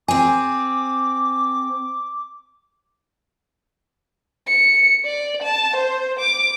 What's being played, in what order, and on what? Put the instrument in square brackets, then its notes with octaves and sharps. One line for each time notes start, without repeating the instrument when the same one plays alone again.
[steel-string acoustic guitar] C4 G#4 [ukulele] G#5 [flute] D6
[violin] C#7
D5
A5
C5
D6